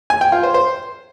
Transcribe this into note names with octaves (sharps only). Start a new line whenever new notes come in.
G#5
G5
F4
C5
C5